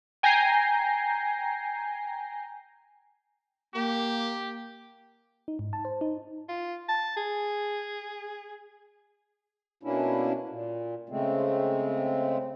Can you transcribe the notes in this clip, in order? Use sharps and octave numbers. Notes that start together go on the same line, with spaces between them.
G5 G#5 A#5 G6 A#6 C7
A#3 G4
D#4
G#2
A5
C5
D#4
F4
A5
G#4
B2 A#3 C#4 D4 E4
A#2
C#3 G#3 A3 C4